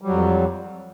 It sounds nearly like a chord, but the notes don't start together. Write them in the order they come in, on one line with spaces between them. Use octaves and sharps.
G3 F#3 F2